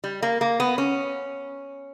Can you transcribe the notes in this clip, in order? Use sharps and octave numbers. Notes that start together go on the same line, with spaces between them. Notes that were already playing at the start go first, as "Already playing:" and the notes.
G3
A#3
A#3
B3
C#4